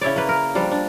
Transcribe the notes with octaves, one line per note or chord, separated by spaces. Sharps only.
C#3 E4 C#5 D5
A#3 B4
A#4
F3 G3 D4
D4